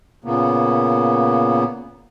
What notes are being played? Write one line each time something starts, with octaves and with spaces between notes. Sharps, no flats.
A#2 C#3 A#3 B3